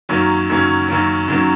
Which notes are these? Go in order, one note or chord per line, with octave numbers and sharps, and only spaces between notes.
F#2 D#3 F#3 A#3 C#4
F#2 D#3 F#3 A#3 C#4
F#2 D#3 F#3 A#3 C#4
F#2 D#3 F#3 A#3 C#4